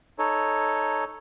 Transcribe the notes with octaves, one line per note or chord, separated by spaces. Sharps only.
D#4 A4 C#5